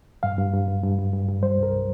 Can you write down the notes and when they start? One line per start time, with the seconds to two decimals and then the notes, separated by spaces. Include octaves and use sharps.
0.23 G2 F5
0.38 G2
0.53 G2
0.68 G2
0.83 G2
0.98 G2
1.13 G2
1.28 G2
1.43 G3 C5
1.58 C2 A#4